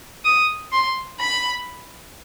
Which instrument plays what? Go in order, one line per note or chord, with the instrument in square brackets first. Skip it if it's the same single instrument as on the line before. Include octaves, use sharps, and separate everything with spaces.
[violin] D#6
C6
B5